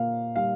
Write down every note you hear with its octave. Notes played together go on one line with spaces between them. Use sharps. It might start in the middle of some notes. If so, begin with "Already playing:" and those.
Already playing: A#2 A#3 F5
G3 F5